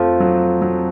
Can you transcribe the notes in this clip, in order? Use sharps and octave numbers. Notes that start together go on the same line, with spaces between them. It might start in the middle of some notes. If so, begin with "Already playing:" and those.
Already playing: F2 F3 A3
F#3
F#3